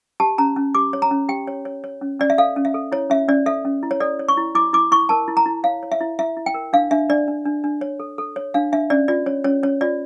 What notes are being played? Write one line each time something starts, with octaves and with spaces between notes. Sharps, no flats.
G4 A5
C#4 A#5
C#4
G4 D6
C#5
A#5
C#4
G4 G5
C#5
C#5
C#5
C#4
C#4 D5
E5
A4 F5
C#4
E5
A4
E4 C#5
C#4 E5
C#4 D5
A4 E5
C#4
E4
C#5
A4 D5
C#5
C#6
E4
E4 D6
E4 D6
E4 C#6
A#4 A5
E4
A#5
E4
C#5 F5
C#5
E5
E4
E4 E5
E4
G5
A#4
D4 F5
D4 E5
D4 D5
D4
D4
D4
C#5
A4
A4
C#5
D4 F5
D4 E5
C#4 D5
F4 D5
C#4 C#5
C#4 C#5
C#4 C#5
F4 D5